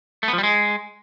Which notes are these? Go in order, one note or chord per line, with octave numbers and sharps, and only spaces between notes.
A3
B3
F3
G3
G#3